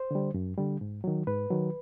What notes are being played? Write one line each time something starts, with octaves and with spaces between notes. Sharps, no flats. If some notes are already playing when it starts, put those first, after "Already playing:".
Already playing: C5
D3 G3
F#2
D3 G3
G#2
D#3 F#3
G#2 B4
D#3 F#3